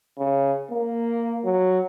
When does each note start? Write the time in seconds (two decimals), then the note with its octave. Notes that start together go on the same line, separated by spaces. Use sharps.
0.18 C#3
0.71 A#3
1.44 F#3